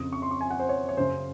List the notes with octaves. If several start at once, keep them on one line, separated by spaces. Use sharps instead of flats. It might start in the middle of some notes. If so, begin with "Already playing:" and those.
Already playing: F2 C#3 D#6
C#6
C6
C#6
G#5
F#5
C5
C#5
C#5
F#2 C#3 C5